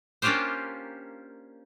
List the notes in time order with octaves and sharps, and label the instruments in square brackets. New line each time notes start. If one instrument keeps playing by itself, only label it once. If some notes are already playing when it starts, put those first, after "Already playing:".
[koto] A#3 C#4 D4 F4 G4 C5